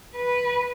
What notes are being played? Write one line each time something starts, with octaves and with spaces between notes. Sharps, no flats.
B4